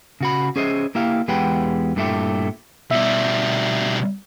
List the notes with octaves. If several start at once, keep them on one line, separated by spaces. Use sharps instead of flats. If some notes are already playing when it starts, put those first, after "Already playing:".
C#3 F#4 B5
C#4 G#4 C5 D#5 E5
A#3 E4 G4 F5
E2 G#3 G4 B4 F#5 G5
G2 A#2 A3 C#4 E4 G4
B2 G3 E5